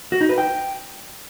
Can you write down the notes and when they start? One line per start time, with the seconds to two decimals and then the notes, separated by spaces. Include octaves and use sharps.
0.12 F#4
0.21 D#4
0.29 B4
0.38 G5